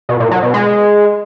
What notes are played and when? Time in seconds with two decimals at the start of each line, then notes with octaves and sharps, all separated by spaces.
0.09 B2
0.20 A#2
0.31 F#3
0.43 B2
0.54 G#3